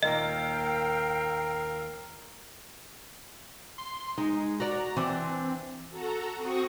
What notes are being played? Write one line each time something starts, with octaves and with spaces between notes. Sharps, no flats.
D#2 A#2 A#3 A#4 D#5 F5 G5 E6
C6
G#3 D#4
F#4 D5 A#5
E3 C4 D4
F#4 A4 A#5
C4 F#4 C#6 D#6 A#6